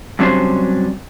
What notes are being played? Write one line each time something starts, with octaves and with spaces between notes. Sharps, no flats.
G2 C3 F#3 C#4 D4 C5